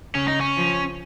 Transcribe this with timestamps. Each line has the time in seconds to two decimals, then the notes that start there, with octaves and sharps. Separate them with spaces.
0.15 C#3 C#4
0.28 D#4
0.41 C#4
0.57 F3